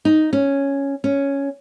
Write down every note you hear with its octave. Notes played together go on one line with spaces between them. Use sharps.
D#4
C#4
C#4